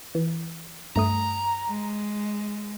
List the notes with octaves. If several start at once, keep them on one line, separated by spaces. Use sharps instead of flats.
E3
G2 A3 A#5 D#6
G#3